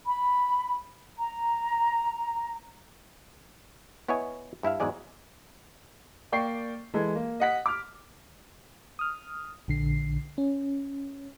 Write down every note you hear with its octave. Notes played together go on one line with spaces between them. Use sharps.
B5
A#5
B3 E4 C#5 D#5 G#5
G2 E4 E5 F5
E2 G#2 F#3 G#3 D5 G#5
A#3 D5 G5 C#6 C7
E3 G#3 A4
A#3
D#5 F#5 B6
D6 F6
D#6 F6
A#1 D3 C7
C#4